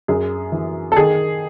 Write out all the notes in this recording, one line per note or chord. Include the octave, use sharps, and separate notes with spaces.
F#2 G#4
E3
A4
D#3 G#4